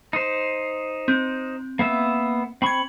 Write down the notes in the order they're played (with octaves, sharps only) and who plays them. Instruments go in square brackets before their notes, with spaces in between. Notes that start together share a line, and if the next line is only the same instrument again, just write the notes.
[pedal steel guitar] D#4 C5
[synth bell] C4
[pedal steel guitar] A#3 B3 E5
[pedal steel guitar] C4 B5 C#6 [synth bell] G#6 F#7